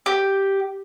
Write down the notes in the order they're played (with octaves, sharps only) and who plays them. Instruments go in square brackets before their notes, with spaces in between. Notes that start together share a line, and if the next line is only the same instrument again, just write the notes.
[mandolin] G4